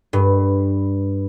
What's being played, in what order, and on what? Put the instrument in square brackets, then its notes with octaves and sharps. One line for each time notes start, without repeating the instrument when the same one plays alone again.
[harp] G2